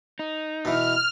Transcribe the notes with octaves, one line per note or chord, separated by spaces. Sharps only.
D#4
B2 E3 F6